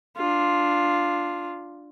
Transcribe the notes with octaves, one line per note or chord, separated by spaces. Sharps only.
D4 F4